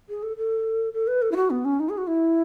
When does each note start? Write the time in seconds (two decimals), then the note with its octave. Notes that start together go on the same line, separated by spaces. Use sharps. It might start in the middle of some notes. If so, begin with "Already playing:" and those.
0.09 G#4
0.23 A4
0.37 A4
0.93 A4
1.07 B4
1.22 A4
1.32 E4
1.36 F#4
1.50 B3
1.65 C#4
1.80 D#4
1.89 G#4
1.97 F#4
2.07 E4